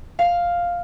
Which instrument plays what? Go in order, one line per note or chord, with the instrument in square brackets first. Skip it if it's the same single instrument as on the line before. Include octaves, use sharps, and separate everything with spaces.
[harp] F5